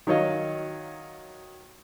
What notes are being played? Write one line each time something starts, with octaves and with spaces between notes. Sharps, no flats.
D#3 F#3 C#5 D#5 F5